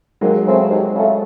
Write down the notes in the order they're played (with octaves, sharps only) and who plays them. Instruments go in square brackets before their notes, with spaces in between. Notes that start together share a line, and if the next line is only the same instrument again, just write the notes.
[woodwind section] D#2 [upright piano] F#3 G#3
[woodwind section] C#3 F3 A3 C4
D#2
C#3 F3 A3 C4